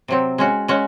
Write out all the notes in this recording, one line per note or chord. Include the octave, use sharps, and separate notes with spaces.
C3 F#3 C4
G#3 C#4 F#4
G#3 C#4 F#4